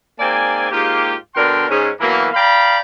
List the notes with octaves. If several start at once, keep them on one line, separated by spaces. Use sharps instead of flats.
G#2 A#3 C4 D5 G#5
G#2 A#3 F4 G4
B2 D3 D4 A#4 G5 C6
G#2 C#4
B2 E3 F#3 A#3
D5 F5 G5 A#5 B5